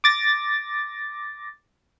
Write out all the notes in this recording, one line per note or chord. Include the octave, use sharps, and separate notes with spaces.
D6 A6 A#6